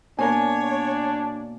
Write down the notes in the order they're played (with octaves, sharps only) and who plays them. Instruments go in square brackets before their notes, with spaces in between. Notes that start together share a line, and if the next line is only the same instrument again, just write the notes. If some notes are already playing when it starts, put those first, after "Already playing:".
[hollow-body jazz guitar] B2 A#3 A#4 [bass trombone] D4 [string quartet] C#5 [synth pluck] G#5